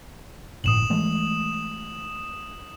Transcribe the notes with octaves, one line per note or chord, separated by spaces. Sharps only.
G1 A2 D#6 E7 F#7
E3 G#3 A3